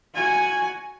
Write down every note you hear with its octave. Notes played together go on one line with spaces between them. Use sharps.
F#4 G#5